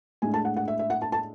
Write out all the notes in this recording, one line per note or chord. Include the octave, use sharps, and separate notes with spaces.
A2 G#3 D4 G#5
A5
F#5
F#5
E5
E5
F#5
A5
A5